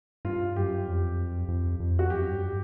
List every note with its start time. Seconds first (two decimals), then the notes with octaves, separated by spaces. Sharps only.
0.25 G2 F4
0.56 F#2 G4
0.87 F2
1.48 F2
1.80 F2
1.99 F#4
2.10 F#2 G4
2.31 G2